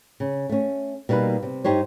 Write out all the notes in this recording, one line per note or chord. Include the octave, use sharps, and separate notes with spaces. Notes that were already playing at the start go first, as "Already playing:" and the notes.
C#3
A3 C#4
B2 G3 A#3 D#4 B4
C3
G2 D#4 G4 C5 C#5